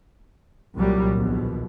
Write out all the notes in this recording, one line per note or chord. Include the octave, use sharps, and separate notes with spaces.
C2 A#2 F#3 G3
A#1 D#2 B2